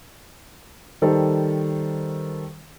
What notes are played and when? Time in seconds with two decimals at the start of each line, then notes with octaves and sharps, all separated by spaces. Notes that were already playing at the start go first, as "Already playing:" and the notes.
1.02 D#3 G3 A4 C5